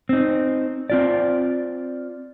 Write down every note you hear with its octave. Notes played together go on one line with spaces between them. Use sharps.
C4 D#4
C4 F4 D5